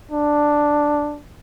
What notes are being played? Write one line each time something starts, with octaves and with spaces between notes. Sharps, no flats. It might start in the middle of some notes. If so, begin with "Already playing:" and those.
D4